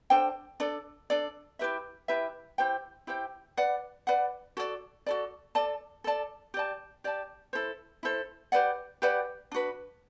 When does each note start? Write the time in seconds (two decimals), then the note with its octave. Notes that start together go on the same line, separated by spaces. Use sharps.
0.10 D4 A4 C5 G5
0.60 D4 A4 D5
1.10 D4 A4 D5
1.59 E4 G4 B4 E5
2.08 E4 G4 B4 E5
2.58 E4 G4 C5 G5
3.07 E4 G4 C5 G5
3.57 B4 D5 F#5
4.07 B4 D5 F#5
4.57 F#4 A4 D5
5.06 F#4 A4 D5
5.55 A4 D5 A5
6.04 A4 D5 A5
6.54 G4 D5 A5
7.04 G4 D5 A5
7.53 E4 A4 C5
8.03 E4 A4 C5
8.52 G4 B4 D5 F#5
9.02 G4 B4 D5 F#5
9.51 D4 F#4 B4